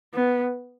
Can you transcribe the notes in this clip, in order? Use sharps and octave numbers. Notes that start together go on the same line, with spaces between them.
B3